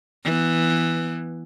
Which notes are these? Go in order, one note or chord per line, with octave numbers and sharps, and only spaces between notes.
E3 B3